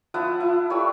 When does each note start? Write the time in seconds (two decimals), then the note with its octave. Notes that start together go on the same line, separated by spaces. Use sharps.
0.14 F3 E4 F#5 D#6
0.40 E4
0.70 G3 A3 C#5 E6